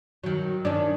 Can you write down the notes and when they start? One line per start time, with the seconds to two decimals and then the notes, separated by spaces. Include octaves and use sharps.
0.24 D#3 F#3
0.65 D#3 C#4 D4